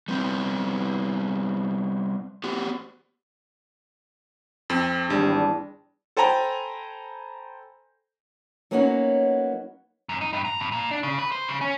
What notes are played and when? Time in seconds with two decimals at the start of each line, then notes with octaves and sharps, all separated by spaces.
0.08 G3 B3 C4
2.44 B3 F#4 G4
4.70 F2 C4
5.10 G#1 E2 G3 D4
6.17 A4 C5 G5 G#5 A#5 B5
8.71 F#3 A#3 B3 C#4 D#4 F#4
10.09 F#2
10.21 D#4
10.33 G2
10.45 A#5
10.59 G2
10.72 A#2
10.91 D4
11.03 C#3
11.19 B4
11.32 C5
11.48 C#3
11.61 C#4